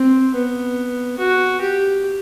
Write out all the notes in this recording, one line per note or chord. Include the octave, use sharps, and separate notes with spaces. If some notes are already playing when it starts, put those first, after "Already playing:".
Already playing: C4
B3
F#4
G4